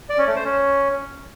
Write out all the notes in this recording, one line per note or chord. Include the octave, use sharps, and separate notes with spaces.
D5
C#4
A3
C5
C#4